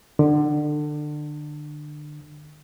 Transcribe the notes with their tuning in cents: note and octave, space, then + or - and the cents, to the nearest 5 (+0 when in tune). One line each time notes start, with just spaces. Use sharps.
D3 +25